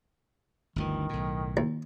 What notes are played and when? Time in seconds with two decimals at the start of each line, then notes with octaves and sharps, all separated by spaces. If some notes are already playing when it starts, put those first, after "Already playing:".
0.76 G1 D2 D#3 E3
1.09 B1 A2
1.57 D#2